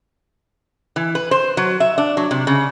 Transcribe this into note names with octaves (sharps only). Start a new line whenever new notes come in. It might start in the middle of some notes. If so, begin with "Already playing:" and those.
E3
B4
C5
F#3
E5
D4
F#3
C3
C#3